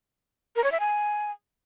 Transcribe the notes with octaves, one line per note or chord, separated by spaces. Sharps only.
A#4
C#5
E5
G#5